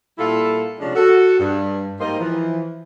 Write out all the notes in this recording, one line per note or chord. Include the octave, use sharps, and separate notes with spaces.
A#2 G3 E4 F4 A4
C3 F3 G#3 C#4 D4
F#4 A4
G2
G#2 G3 A#3 D#4 C5 D#5
E3 F3